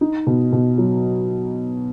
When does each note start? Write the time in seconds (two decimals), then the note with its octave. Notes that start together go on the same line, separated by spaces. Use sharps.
0.01 D#4
0.27 B2
0.52 B2
0.78 F#3